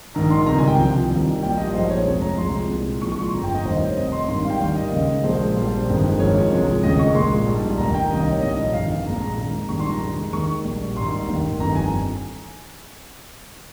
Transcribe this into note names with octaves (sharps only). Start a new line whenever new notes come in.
A#1 G#2 D#3 A#5
C6
C#2 C3 D#3 G3 A#5
G#5
G5
C2 C3 F3
D#2 D#3 G3
A#1 A#2 G3 G5
D#5
A#1 G#2 F3 G#3 C5
C#5
F1 F2 C3 F3 G#3
A#5
C2 C3 F3 G#3 C6
C2 A#2 G#3
A#1 A#2 F3 G#3 C#6
C#6
C6
G1 F2 C3 A#5
G5
D#5
F1 D#2 D#3 G3 C5
C#5
F1 F2 C3 D#5
C6
G#1 G#2 D#3 G3 C6
C6
F5
G5
D#2 D#3 G3 F5
D#5
D#2 C#3 G#3
A#1 A#2 F3 G#3 C5
A#1 A#2 G3 C5
G1 F2 D#3 G#3
G#1 G#2 F3 G#3 C#5
C2 C3 F3 G#3
F1 D#2 C#3 G#3 D#5
C#6
A#1 A#2 G#3 C6
A#1 G#2 G3
F1 D#2 D#3 A#5
G5
C2 C3 D#3 G3 D#5
D#5
C#5
A#1 G#2 G3 D#5
G1 F2 C3 D#3 F5
F5
A#1 A#2 G#3 A#5
A#5
F2 D#3 G#3
A#1 G#2 D#3 G3 C#6
C6
A#5
F2 C3 D#3 G#3
D#2 D#3 G#3 C#6
A#1 A#2 G3
G#1 G#2 G3 C6
F1 D#2 D#3
G1 F2 D#3 G3 A#5
G#5